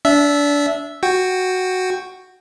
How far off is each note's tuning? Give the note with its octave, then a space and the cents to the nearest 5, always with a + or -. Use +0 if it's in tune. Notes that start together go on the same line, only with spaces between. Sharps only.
D4 -25 E5 +0
F#4 +0 G5 +10